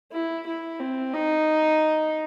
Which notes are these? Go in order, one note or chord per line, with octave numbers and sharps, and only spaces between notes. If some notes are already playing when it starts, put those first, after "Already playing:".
E4
E4
C4
D#4